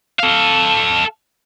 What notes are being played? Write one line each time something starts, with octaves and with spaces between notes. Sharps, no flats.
A4 F5